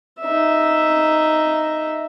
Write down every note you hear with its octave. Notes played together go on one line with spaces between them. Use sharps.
D#4 E5